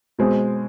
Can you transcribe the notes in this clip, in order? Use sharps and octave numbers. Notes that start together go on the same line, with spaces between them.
B2 G#3 C4